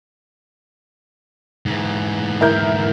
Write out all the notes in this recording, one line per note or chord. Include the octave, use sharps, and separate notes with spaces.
G#2 E3
E4 A#4 G6